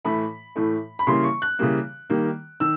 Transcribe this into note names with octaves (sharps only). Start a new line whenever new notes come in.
A2 E3 A3 B5
A2 E3 A3
B5
C#3 E3 G3 A#3 C6
C#6
F#6
C#3 E3 G3 A#3
D#3 G3 A#3
D#3 E6